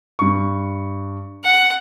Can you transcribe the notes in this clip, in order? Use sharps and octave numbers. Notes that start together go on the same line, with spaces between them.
G2 C#6
F#5